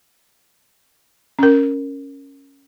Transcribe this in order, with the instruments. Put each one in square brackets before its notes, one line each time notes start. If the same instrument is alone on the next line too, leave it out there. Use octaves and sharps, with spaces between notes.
[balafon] C#4 A#4